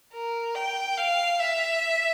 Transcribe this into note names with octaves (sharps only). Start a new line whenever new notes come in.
A#4
G5
F5
E5